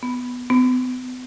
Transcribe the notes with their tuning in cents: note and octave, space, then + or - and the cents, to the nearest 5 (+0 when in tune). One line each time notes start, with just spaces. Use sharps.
B3 +5
B3 +40